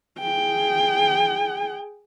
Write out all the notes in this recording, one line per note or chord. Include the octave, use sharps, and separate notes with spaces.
G#4 G5